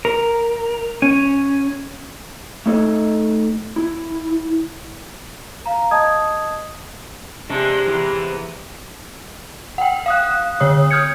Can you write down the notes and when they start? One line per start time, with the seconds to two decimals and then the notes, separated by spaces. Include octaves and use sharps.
0.05 A#4
1.02 C#4
2.66 A3 D#4 A4 C#5 D#5
3.76 E4
5.66 F5 A#5
5.91 D#5 A5 D#6 G#6
7.49 C3 G#3 D4
7.88 E3 B3
9.78 F#5 G5
10.06 F5 D#6 F#6
10.60 D3 C#5 D#6
10.91 D#6 F6 G6 G#6 C#7